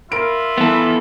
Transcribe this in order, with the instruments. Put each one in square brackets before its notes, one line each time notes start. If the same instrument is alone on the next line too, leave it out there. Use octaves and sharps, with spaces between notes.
[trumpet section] F4 E5 B5 [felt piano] A#4 D7
[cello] E3 [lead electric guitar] B3 A4